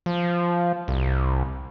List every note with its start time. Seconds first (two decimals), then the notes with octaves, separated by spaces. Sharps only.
0.06 F3
0.88 C2